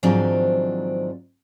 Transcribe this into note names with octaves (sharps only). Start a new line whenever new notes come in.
G#2 D#3 F3 F#3 C4 D4